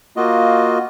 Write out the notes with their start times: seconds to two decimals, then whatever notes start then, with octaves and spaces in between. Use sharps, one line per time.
0.17 A#3 F4 F#4 D#5